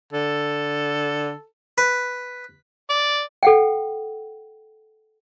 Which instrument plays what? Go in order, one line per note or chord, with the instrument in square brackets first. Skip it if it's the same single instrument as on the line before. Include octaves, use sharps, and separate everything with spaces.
[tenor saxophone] D3 [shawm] A4
[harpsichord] B4
[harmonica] D5
[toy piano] A4 F#5 G5